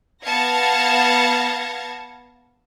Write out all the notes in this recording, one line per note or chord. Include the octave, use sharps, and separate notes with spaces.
B3 F5 A5 G#6 A#6 C#7